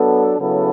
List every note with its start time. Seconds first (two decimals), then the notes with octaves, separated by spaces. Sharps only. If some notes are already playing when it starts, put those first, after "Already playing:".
Already playing: F#3 B3 D4 A4
0.38 C#3 F#3 B3 E4 A4